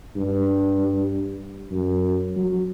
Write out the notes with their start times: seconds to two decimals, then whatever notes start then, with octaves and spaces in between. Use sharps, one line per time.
0.16 G2
1.71 F#2
2.36 F#3